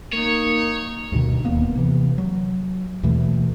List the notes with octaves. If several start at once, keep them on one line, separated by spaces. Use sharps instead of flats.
A#3 D#4 C#5
D2 G2 B2 D#3
D1 D#2 A#3 B3
C3 E3
F#3
D#2 B2 E3 A3